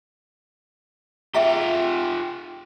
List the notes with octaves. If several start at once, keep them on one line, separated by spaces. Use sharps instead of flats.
F4 G4 G#4 E5 A#5